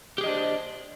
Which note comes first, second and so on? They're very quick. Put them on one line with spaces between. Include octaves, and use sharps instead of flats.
G4 G#4 D#5 D4 C5